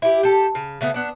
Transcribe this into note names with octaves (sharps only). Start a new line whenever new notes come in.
E4 G4
G4 A4
C#3
C#3 A3 B3
B3 D4